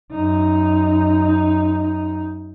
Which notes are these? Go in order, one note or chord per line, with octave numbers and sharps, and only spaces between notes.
F#2 D#4